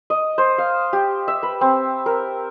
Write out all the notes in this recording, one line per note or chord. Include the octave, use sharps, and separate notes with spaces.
D#5
C5
F5
G4
E5
B4
C4
A#4